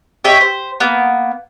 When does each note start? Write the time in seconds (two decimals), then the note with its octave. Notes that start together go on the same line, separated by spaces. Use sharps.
0.24 C#5 D#5 E5 G5
0.41 C5
0.80 A#3 B3